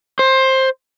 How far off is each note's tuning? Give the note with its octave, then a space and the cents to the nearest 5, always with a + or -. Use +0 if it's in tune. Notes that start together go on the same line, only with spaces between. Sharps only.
C5 +15